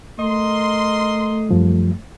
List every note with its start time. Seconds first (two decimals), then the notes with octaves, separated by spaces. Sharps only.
0.19 A3 A#4 D#5 C6
1.49 F#2 F3 G3